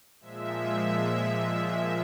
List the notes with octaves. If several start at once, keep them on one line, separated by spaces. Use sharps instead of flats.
A#2 F3 G#3 E5